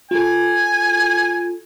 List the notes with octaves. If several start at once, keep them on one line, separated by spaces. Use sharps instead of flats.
F4 A4 G#5